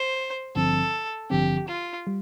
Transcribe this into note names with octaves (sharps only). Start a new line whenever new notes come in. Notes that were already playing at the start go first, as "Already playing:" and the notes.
Already playing: C5
A1 G2 D3 F3 C4 A4
A1 G2 D3 F3 C4 G4
F4
G3